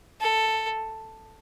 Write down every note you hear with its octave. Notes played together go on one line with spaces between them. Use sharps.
A4